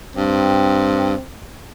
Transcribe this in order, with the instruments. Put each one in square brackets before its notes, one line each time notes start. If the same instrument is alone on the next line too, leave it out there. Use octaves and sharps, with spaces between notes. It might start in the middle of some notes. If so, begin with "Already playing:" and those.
[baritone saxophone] G2 [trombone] C4